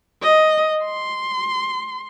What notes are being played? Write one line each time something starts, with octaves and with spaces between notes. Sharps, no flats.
D#5
C6